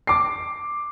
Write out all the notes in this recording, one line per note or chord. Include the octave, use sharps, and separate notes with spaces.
D6 C7